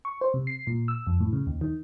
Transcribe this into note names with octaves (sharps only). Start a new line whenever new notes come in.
C#6
C5
C3
C7
A#2
E6
F2
A2
C#3
D#2
D#3